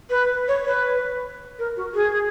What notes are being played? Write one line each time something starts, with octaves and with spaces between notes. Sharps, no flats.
B4
C#5
B4
A#4
F#4
G#4